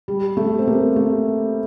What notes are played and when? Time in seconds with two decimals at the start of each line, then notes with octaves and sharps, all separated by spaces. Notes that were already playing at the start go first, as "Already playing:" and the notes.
0.08 G3
0.37 A3
0.59 C4
0.67 A#3
0.96 A3